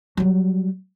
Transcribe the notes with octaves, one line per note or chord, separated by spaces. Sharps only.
F#3 G3